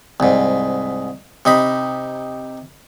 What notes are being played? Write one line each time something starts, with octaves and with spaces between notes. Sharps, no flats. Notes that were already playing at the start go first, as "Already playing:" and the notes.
C2 G#2
C3 D#4 B5